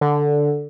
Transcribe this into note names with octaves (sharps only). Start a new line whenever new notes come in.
D3